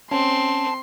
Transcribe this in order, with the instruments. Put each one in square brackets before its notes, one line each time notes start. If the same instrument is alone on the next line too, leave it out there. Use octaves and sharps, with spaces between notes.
[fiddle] C4 [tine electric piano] C#4 [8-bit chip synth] A5 [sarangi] C6